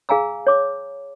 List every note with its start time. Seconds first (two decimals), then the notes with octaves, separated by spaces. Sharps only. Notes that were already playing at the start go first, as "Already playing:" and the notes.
0.09 G#4 F5 G#5 A#5 E6
0.47 C#5 D6